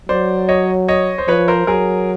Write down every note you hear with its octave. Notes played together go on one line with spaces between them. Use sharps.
F#3 C5 D5
C#5 D#5
C#5 D#5
C5
F3 B4 C#5
A#4 C5
F#3 G#4 A#4